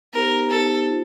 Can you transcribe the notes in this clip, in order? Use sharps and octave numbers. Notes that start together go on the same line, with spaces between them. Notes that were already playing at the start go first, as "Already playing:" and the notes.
B3 D#4 G4 A#4 C5
B3 D#4 G4 A4 C5
F4